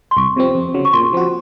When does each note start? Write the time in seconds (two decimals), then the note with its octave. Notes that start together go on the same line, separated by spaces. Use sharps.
0.11 C6
0.17 C2 C#6
0.36 C3 F3 C4
0.55 F2
0.74 C#3 F#3
0.85 C#6
0.93 A#2 C6
1.13 F3 C4 F#4